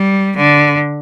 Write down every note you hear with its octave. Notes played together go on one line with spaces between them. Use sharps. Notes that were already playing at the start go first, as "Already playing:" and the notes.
Already playing: G3
D3